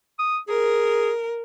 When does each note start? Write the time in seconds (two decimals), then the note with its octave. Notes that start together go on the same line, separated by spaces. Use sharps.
0.19 D#6
0.48 G#4 A#4